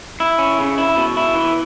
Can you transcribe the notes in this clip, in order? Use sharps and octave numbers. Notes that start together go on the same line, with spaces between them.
E4
C#4
C#3
E4
B2
E4
E3